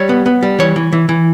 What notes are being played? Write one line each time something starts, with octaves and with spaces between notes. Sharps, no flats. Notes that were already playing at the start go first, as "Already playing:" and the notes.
Already playing: G3 C#5
B3
B3
G3
E3 C#5
E3
E3
E3